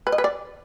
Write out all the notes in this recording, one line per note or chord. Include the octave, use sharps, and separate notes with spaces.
B4
D#5
B4
D5